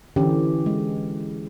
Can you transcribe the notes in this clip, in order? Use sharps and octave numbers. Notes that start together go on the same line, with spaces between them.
D3 E3 C#4 G4
G#3